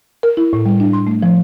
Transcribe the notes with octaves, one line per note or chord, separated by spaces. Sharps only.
A#4
E4
A2
G3
D4
C6
A3
F3